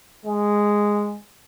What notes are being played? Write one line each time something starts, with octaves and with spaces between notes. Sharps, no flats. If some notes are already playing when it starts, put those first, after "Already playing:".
G#3